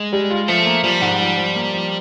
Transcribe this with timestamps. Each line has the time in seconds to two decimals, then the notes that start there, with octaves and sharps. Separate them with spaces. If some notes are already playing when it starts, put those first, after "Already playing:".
Already playing: G#3
0.13 G3
0.31 F4
0.48 F3 A3
0.66 A#3
0.84 F3 G3
1.02 G#2
1.19 F3
1.37 F3
1.55 A#3
1.73 F3